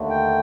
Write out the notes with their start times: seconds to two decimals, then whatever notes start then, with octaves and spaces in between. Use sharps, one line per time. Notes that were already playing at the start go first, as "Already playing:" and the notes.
Already playing: D#2 D3 A3
0.10 G5